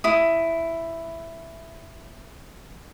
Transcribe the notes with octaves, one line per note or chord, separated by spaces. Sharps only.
E4 D#6